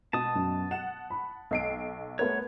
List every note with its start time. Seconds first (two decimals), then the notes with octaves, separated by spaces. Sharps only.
0.13 B2 A5 D#6
0.35 F#2
0.71 F#5 E7
1.10 B5
1.51 B1 D#5 C7 D7
2.19 A3 B3 A#4 C#5